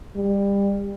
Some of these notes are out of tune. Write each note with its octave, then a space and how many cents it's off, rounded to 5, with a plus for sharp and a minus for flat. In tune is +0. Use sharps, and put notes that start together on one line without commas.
G3 +25